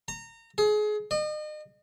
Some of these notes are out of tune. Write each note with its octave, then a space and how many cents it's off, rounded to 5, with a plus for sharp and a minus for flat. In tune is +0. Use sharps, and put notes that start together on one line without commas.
A#5 -25
G#4 +30
D#5 -40